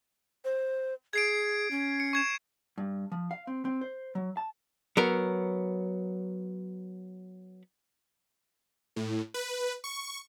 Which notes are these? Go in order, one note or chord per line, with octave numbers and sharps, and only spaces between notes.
C5
G#4 G#6 C7 D7
C#4
C#7
C#6 G#6 E7
G2
F3
F5
C4
C4
C5
F#3
A5
F#3 B3 A#4
A2
B4
C#6